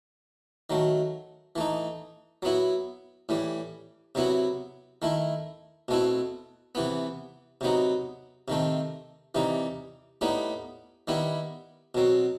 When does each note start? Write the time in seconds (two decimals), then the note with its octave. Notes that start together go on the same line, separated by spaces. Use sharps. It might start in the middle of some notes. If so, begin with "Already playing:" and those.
0.70 D#3 F#3 A3
1.56 E3 A3 D#4
2.42 F#3 B3 E4
3.29 A2 E3 G3
4.15 C3 F#3 B3 E4
5.02 D#3 A3 E4
5.88 B2 A3 C4 E4
6.75 C3 E3 B3
7.61 C3 F#3 B3 D#4
8.48 C3 D#3 A3 C4
9.35 C3 E3 G3 D#4
10.21 A2 G3 B3 D#4
11.08 D#3 G3 B3 E4
11.95 B2 F#3 C4